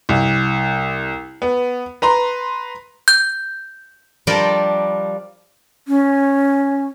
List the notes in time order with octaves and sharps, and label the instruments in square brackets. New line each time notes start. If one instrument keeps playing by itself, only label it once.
[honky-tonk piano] C2
B3
B4 A#5 C6
[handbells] G6
[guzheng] F3 G3 D4 G4 A#4 D5
[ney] C#4